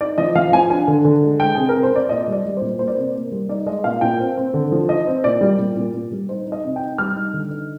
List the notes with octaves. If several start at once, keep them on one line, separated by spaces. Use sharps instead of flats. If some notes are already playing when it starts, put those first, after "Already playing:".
D#4 D5
F3 D#5
F3 F5
F3 G#5
D4 G#5
D3
D3
G#3
G#3 G5
C3 G#4
A#4
C3
C5
C3 D5
A#2 D#5
G3 D5
G3
C5
A#2
A#3 C5
D5
C3 C5
A#3
G3
D#4 D5
G#3 D#5
A#2 F5
A#2 G5
C4
C4
D3
F3
D#4 D#5
C4
A#2 D5
G3
A#2
A#2
A#2
G3
D#4 C5
D#4
D#5
C3
G5
D#4
G3 F6
D#4
D3
D#4